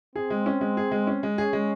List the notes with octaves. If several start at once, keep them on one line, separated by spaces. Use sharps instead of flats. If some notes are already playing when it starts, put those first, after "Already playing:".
C4 G#4
G#3
C#4
G#3
G#4
G#3
C#4
G#3
C#4 G#4
G#3